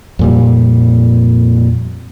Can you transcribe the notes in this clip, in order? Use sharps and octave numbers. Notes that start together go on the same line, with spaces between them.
F2 A#2 G3